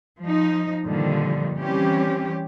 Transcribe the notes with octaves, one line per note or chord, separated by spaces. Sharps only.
F3 D#4
G2 A#2 D3 D#3 F3 G3
E3 G3 C4 C#4 G4